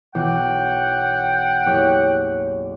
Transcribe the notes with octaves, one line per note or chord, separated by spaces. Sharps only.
B1 E3 F#5 G5
F#1 G4 C#5